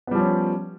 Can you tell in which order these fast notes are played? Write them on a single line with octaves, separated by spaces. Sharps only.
B3 G3 F3 C#4